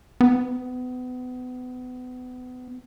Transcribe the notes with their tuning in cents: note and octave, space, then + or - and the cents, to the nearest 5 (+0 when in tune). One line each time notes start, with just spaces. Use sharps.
B3 +30